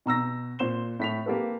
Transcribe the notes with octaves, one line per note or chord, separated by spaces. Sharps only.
B2 A#5 E6 A#6
A#2 C5 C6 E7 G7
A2 B6 F7
A#3 G4 A4 B4